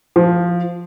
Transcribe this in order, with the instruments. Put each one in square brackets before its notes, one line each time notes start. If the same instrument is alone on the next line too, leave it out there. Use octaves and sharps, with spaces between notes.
[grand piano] F3